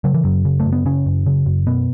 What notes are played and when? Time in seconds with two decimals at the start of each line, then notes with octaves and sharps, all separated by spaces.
0.04 C#3 F#3
0.14 E3
0.24 F#2 F#3
0.45 C#3
0.60 A3
0.66 F#2
0.72 B3
0.85 C#3 C#4
1.06 F#2
1.26 C#3
1.46 F#2
1.67 B2 B3